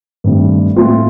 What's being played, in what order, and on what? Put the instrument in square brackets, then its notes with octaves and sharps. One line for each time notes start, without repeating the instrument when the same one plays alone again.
[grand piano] G2 D#3 A3 C4
A2 A3 C4 F4